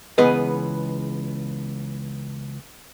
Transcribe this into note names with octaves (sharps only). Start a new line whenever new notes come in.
C#2 E3 B3 G#4 B4 D#5